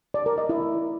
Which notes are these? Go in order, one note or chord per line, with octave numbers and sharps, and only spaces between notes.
D5
A#4
D#5
E4